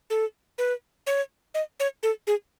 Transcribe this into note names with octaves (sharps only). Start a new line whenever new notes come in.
A4
B4
C#5
D#5
C#5
A4
G#4